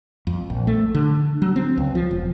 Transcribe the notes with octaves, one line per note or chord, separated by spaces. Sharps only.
F2
A#1
A3
D3
F#3
C4
C#2
F3
E1